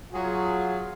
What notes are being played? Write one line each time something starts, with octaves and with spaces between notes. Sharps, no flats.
F#3 F4 G#4